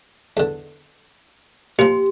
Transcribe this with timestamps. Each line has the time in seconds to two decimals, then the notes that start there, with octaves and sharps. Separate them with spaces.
0.37 E2 D3
1.79 A#2 F3 G4